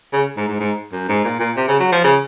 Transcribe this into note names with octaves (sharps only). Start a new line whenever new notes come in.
C#3
G#2
G#2
G#2
F#2
G#2
A#2
A#2
C3
C#3
F#3
F3
C#3